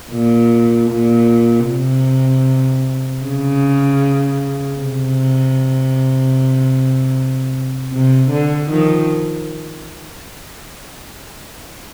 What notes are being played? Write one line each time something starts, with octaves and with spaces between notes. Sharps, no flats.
A#2
A#2
C3
C#3
C3
C3
D3
D#3 F3